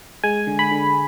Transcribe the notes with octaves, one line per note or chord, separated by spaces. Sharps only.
G#3 G#5
D3
B5
D3